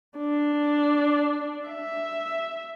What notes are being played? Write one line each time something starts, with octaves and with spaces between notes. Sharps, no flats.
D4
E5